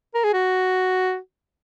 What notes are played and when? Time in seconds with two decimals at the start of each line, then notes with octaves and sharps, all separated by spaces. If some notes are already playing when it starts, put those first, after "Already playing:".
0.15 A#4
0.24 G#4
0.33 F#4